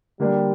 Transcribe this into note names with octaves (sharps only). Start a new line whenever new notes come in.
D3 G3 A#3 D4 G4